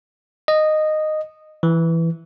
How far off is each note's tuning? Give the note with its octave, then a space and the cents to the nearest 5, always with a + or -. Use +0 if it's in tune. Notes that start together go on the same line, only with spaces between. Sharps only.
D#5 -10
E3 +5